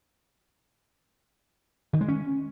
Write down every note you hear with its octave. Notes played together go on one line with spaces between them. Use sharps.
D#3
G#3
C#4